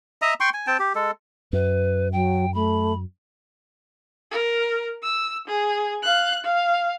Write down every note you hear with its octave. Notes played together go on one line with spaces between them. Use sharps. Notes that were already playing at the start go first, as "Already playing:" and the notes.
D#5 E5 A#5 D#6
G5 C6 C#6
G#5
C4 G5 A5
G4
G#3 A4
F#2 B4
F#3 G5
A3 B5
A#4
E6
G#4
F5 F#6
F5